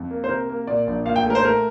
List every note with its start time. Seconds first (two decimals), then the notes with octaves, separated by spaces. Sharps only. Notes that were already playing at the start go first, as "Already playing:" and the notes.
Already playing: F2
0.11 A#3
0.24 C5
0.29 C3 A#4
0.49 A#3
0.67 A#2 D5
0.87 A#1
1.05 A#2 F5
1.16 G5
1.26 A3 A#4
1.35 C5
1.44 A3 A#4